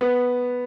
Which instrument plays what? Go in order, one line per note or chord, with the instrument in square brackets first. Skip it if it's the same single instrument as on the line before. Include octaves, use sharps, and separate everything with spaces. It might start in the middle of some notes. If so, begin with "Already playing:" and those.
[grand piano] B3